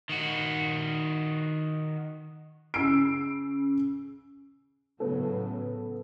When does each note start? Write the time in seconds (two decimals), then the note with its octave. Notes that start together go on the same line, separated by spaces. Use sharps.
0.09 D#3 F#4
2.74 C#3 E6 C7 D7
5.00 A2 C#3 F#3 B3 A4